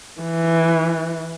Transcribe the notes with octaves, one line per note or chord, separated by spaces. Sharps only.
E3